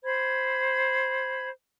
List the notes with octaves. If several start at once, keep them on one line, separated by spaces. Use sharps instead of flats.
C5 B5 G#6